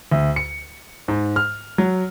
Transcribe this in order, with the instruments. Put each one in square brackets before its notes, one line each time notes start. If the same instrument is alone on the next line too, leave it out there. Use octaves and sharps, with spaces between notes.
[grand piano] D2
C#7
G#2
F6
F#3